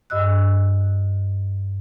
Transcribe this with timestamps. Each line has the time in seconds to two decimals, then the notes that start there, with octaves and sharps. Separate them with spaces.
0.10 G2 D#5 E6 F#6